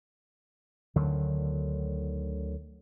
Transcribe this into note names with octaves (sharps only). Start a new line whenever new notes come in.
D2 D3 D#3 F#3